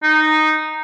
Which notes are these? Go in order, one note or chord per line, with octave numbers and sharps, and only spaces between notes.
D#4